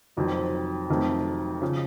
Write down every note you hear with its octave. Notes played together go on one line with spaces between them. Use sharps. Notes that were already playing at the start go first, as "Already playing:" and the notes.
F1 F2 D#3 F#3 C4
F1 F2 D#3 F#3 A3
C#3 F3